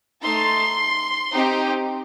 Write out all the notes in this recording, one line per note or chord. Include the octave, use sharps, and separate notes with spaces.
A3 D#4 A4 C6
C4 D#4 G4